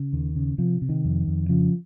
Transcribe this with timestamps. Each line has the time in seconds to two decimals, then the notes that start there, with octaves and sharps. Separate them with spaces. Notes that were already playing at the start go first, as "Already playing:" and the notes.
Already playing: C#3
0.13 D#2 D#3
0.36 C#3
0.58 C3 F3
0.82 C3
0.89 D#3
1.05 F2
1.28 F2
1.49 C#3 F3